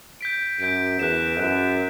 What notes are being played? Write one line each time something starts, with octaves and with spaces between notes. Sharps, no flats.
G6 B6 D7
F#2 G6 B6 D7
E2 F#6 B6 E7
F#2 F#6 B6 E7